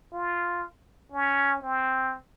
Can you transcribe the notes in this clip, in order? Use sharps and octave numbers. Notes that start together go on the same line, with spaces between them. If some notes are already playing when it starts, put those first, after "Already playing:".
F4
C#4
C4